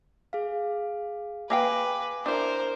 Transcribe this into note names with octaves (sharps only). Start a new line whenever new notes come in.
G#4 F5
A#3 B4 F5 G5 G#5 D6 A#6
D4 E4 A#4 C5